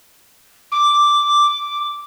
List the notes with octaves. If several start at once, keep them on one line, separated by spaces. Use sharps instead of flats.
D6